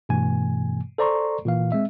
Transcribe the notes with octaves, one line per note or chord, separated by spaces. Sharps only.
G2 B2 E3 A3 G#5
A4 C5 D5 A#5 C6 C#6
A#2 E3 F5
G#3 C4 E5